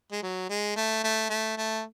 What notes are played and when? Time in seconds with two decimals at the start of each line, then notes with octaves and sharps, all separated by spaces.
0.12 G#3
0.22 F#3
0.49 G#3
0.76 A3
1.04 A3
1.30 A3
1.57 A3